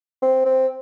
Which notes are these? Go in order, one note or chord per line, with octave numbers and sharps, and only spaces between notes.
C4
C4